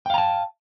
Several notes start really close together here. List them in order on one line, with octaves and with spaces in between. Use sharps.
G5 F5 A#5 A5